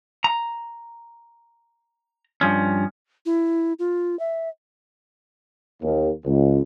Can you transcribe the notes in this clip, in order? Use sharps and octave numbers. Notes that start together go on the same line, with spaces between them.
A#5
G2 F3 C#4
E4
F4
E5
D#2
C#2